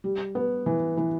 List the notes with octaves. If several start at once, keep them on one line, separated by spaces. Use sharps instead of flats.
G3
B3
E3
E3